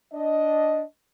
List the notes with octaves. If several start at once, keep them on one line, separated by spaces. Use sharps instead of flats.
D4 D#5